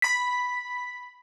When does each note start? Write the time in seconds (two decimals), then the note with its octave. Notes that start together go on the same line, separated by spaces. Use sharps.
0.02 B5 B6